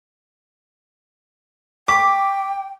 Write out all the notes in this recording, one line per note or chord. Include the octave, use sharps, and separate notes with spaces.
G5 C#6 D6 B6